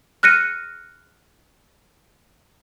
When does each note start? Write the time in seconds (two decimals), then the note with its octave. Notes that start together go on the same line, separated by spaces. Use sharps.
0.23 F6 F#6 A#6 C#7 D#7